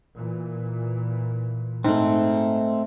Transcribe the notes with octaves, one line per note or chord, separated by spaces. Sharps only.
A#2 E3
G#2 A3 C4